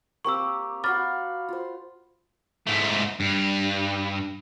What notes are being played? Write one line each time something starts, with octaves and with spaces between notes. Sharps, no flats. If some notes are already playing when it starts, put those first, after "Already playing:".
A#3 C4 G4 C#6 E6
F#4 F5 B5 D6 F6 A6
F4 C5
G#2 A3
G2